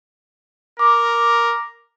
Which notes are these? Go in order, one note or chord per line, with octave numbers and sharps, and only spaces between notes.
A#4 D6